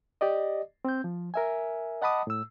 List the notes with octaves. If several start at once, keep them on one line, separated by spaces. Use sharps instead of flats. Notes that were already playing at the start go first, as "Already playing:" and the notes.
G4 D5 D#5
C4 G6
F3
A#4 E5 G#5
D#5 F#5 A5 B5 D6 D#6
A2 E6